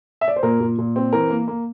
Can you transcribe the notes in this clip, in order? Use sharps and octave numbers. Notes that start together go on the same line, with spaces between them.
E5
D5
C5
A#2 A#4
A#2
A#2
C4
E3 A#4
A#3
A#3